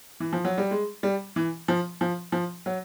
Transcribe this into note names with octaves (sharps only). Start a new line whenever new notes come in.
E3
F3
F#3
G3
G#3
G3
E3
F3
F3
F3
F#3